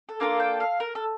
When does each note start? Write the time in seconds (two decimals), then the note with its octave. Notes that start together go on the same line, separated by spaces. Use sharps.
0.09 A4
0.20 A#3 D4 F4 A4 A#4
0.40 G5
0.60 F5
0.80 A#4
0.95 A4